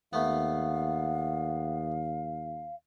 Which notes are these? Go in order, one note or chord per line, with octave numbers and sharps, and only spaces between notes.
D#2 A3 B3 F5 F#5